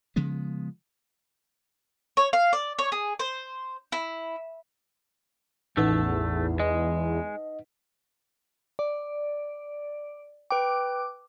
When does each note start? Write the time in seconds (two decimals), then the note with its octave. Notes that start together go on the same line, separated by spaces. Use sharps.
0.16 C#3 F3 G#3 B3
2.17 C#5
2.33 F5
2.53 D5
2.79 C#5
2.92 G#4
3.19 C5
3.92 E4
5.77 A1 E2 A3 D#4 B4 F#5
6.60 G#3 D#5
8.79 D5
10.51 B4 G5 D6